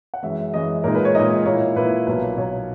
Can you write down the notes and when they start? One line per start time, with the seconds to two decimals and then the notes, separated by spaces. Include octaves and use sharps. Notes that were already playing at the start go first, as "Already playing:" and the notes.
0.14 F#5
0.23 F#2 E3 G#3 E5
0.54 F#2 E3 G#3 D#5
0.84 A#2 G#3 D#4 A#4
0.95 B4
1.05 C#5
1.15 A#2 G#3 D#4 D#5
1.46 A#2 A#3 E4 C#5
1.76 A#2 A#3 E4 B4
2.07 B1 A#2 F#3 A#3 B4
2.38 B1 A#2 F#3 A#3 C#5